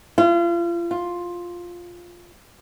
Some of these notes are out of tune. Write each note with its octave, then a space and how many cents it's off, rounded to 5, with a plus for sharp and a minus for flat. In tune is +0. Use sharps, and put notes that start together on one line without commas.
F4 -35
F4 +5